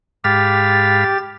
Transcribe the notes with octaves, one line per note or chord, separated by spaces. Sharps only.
G#2 G4 F5 B5 A6